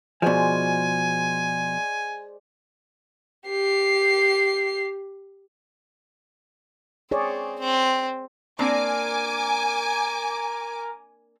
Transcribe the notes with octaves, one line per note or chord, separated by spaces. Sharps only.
B2 F3 G#3 C5 D5 G#5
G4 C7
C4 G#4 C#5 D5
C4
A#3 C4 D4 A#4 G#5 D6